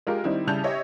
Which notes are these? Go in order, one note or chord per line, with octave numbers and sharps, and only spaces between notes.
G#3 F4 G4 A#4
D#3 G3 C4 D#4 E4
C#3 G3 E4 A5 G6 F7
G4 C#5 D#5 E5